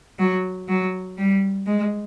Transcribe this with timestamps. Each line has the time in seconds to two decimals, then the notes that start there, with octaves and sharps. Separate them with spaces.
0.19 F#3
0.69 F#3
1.18 G3
1.67 G#3